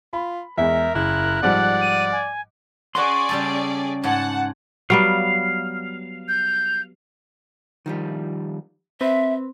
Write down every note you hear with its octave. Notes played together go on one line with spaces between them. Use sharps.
F4 B5
E2 G#3 A#4 E5
F#1 E4 F#6
G#2 F3 G3 D5 F#5
D#7
G#5
C#4 F#4 G#4 D5 D#5 F#5 C6 C#6
C#3 G3 A4
G#2 F#5 A5
F#3 G3 B3 F5
G6
D#3 F3 G3
C4 B4 E5